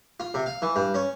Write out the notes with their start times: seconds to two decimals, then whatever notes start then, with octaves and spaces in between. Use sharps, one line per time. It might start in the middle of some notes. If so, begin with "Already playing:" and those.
0.20 F4
0.34 C3
0.46 F5
0.62 E3
0.76 G2
0.94 C#4